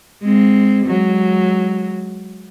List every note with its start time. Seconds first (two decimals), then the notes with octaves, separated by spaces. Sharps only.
0.21 G#3 C4
0.85 F#3 G#3